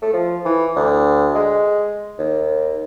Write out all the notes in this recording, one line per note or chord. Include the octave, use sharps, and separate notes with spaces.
A3
F3
E3
D2
G#3
D#2